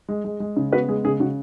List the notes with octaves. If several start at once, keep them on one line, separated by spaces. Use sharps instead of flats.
G#3
G#3
G#3
C#3
B3 F#4 B4
G#3 G#4
C#3 G#4
C#3 F#4